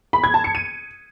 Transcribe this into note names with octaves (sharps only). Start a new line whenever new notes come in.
B5
G#6
A5
C#7
D#7